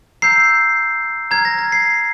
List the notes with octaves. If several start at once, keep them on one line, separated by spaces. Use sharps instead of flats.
A#5 E6 G6 C7
A#5 F6 G#6
A#6
A#6
C7